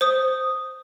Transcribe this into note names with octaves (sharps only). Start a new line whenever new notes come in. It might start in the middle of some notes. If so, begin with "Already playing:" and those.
C5 D#6